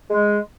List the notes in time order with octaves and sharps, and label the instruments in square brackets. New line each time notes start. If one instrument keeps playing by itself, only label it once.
[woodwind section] G#3